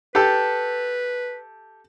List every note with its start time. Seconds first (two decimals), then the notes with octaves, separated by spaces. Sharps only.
0.15 G4 A4 B4